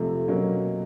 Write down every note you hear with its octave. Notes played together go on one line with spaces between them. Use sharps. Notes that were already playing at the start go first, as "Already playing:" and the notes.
Already playing: F2 C3 F3 A3
B2 F#3 A#3 C#4